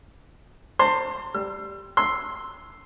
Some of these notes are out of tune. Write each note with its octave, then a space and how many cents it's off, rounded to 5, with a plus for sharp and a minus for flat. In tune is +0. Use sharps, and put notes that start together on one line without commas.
C5 +0 A5 +40 C6 +0
G3 +0 E6 +35
C6 +0 E6 -5